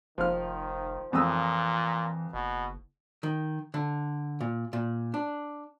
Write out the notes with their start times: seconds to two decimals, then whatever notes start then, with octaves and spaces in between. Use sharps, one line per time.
0.18 F1 D#3 F3 F5 F6
1.13 F2 A#2 E3 D#6 E6
2.34 F#1 B2
3.23 D#3
3.74 D3
4.41 A#2
4.73 A#2
5.14 D4